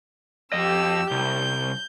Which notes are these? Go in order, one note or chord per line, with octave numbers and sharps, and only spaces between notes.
F2 G4 D#5 E6
C2 G6